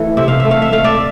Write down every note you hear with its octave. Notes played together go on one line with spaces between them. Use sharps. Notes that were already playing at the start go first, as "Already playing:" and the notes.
Already playing: E3 A3
C3 E5
F5
E5
A3
F5
E5
A3 F5
D5 E5